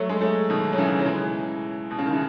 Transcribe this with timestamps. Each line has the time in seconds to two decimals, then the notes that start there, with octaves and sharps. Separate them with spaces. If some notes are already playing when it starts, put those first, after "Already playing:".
Already playing: F#3 A3
0.09 G#3
0.21 F#3 A3
0.50 B2 D#3
0.73 F#3
0.78 C#3 E3
1.00 F#3
1.06 E3 G#3
1.91 B2
1.98 C#3
2.06 D#3
2.13 E3